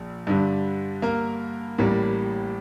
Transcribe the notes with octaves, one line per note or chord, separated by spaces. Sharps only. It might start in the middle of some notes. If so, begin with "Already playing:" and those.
Already playing: A#1
G2 D3 G3
A#3 A#4
A1 A2 G3 A#3